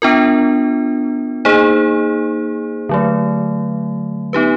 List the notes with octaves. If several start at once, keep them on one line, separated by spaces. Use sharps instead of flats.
B3 D4 F4 A#4
A#3 D#4 G#4 C5
D3 F#3 A3
B3 D#4 G4 B4